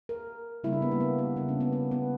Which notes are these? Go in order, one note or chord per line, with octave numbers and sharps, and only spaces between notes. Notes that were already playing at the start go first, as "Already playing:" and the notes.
A#4
C#3 G3 A#3 E4
D4
B3
A#3
B3
B3
C#3 G3 A#3 D4
C#4
B3
B3
B3